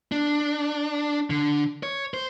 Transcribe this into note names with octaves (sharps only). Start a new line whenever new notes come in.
D4
D3
C#5
C5